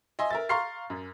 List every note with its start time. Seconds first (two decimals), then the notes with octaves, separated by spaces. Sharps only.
0.19 D#5 E5 G#5 C6
0.30 A#4 E5 A6
0.49 F5 A#5 C6 C#6 F6 C7
0.90 F#2